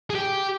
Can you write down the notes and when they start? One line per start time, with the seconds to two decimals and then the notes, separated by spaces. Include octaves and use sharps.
0.10 G#4
0.15 G4